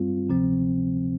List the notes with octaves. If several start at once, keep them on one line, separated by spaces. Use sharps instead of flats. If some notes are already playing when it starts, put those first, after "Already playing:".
Already playing: G2 G3 C4 F4
D2 C3 F3 C4